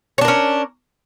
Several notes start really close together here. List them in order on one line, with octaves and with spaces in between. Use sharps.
C#5 D4 A#4 C#4